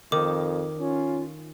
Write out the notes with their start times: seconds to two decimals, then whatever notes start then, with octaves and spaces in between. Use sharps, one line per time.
0.12 F2 D#3 D6
0.79 C#4 F4